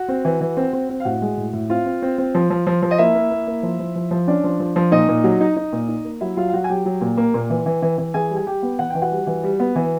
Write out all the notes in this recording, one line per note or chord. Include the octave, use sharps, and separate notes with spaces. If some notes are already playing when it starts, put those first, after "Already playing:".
Already playing: F#4 F#5
C4
E3
E3
C4
C4
C4
F5
A2 F#4 F#5
G#3
A2
A2
C4 F4 F5
C4
C4
C4
F3
F3
F3
F3
D#5
A#3 E4 E5
A#3
A#3
A#3
F3
F3
F3
F3
C#4 D4 D5
F3
F3
F3
A#2 D#4 D#5
A#2
F#3
D#4
D#4
A#2
D#4
A#3
F#3 E4 E5
F#3 F4 F5
F5
F#3 F#4 F#5
G#5
F#3 G4 G5
F#3
A#2
A#3
A#2
E3
E3
E3
E3
E3 G#4 G#5
G3
G#5
G3 G4 G5
B3
E3 F#5
E3 G5
F#4 F#5
G3
E3
G3
B3
E3